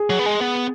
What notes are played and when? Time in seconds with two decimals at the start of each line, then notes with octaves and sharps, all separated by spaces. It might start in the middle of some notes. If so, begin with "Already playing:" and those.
Already playing: G#4
0.10 F#3
0.19 B3
0.26 G#3
0.41 B3